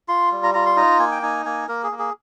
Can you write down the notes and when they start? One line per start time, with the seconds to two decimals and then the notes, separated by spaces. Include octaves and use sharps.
0.08 F4 C6
0.32 G3
0.43 A#5
0.54 F4 A#5
0.66 C6
0.76 D#4 A#5
0.99 A#3 G#5
1.12 G5
1.23 D#4 G#5
1.46 A#3 G#5
1.68 A#3 A#4
1.83 G#4
1.92 A#3
1.99 G#4